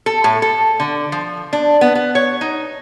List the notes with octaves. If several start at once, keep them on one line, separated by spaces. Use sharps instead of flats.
A4
A2
A4
D3
F3
D4
B3
B3
C#5
D#4